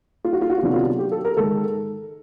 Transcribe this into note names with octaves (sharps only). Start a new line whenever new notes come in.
F4
F#4
F4
F#4
F4
C3 D#3 F#3 B3 D4 F#4
F4
G4
A4
A#4
G#2 D#3 G#3 A4